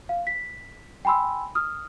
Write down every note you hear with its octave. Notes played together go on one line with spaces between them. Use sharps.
F5
B6
G5 G#5 B5 C6 E6
D#6 F6